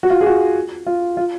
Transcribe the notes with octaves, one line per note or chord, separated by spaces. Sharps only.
F#4
F4
G#4
F#4
F4
F4